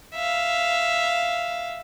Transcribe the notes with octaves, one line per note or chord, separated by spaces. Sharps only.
E5 F5